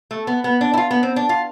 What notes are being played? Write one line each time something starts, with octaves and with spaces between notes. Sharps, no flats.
A3
B3
B3
D4
E4
F4
B3
C4
D4
F4